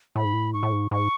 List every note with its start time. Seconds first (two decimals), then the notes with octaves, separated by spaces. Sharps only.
0.16 A2 B5
0.25 G#2
0.33 A2
0.53 G#2 C#6
0.63 A2
0.72 G#2
0.91 G#2 C#6